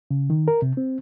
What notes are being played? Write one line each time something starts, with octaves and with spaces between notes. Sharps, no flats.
C#3
D#3
A#4
C3
C4